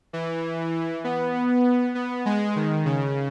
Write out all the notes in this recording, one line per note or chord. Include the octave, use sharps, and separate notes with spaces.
E3
B3
B3
G#3
D#3
C#3